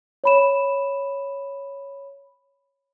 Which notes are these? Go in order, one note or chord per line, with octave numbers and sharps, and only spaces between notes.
C#5 B5 E7